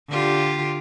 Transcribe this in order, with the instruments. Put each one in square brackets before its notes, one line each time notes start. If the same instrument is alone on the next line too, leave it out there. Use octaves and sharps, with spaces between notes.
[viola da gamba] D3 F4 G4